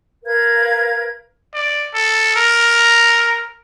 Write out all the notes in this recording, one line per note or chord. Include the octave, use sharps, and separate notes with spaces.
A#4 B4 F5 G#6
D5
A4
A#4